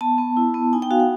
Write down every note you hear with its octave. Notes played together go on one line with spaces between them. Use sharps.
B3 A5
B3
E4
B3
D#4 G#5
G5
F#4 F5
F#5